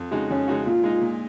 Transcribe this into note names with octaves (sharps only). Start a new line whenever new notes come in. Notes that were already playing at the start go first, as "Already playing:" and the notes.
Already playing: F2
C#3 G#3 D#4 F#4
F2 C#4
C#3 G#3 D#4 F#4
A#2 F4
G#3 D#4
A#2